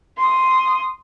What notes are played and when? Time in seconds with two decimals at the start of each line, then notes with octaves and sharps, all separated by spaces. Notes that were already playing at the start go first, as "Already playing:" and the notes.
0.18 C6 D#6